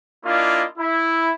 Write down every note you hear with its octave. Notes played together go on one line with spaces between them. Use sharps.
A#3 D4 E4 F4 D#5
E4